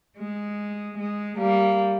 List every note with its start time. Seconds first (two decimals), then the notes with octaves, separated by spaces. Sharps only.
0.17 G#3
0.98 G#3
1.39 G3 A#3